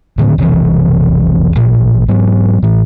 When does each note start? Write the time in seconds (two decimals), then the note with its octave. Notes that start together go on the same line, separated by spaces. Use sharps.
0.18 A2 D3 D#3 C4
0.38 F1 B1 C3 E3
1.55 A1 A#2
2.08 G#2 F#3 B3
2.63 A2 E3